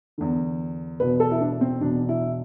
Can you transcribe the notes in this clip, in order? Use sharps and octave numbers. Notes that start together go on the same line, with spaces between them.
E2 D3
E2 B2 B4
A4
E4
D4
C4
E2 B2 D4
E4